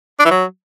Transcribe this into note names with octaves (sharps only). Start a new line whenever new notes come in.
D4
E3
F#3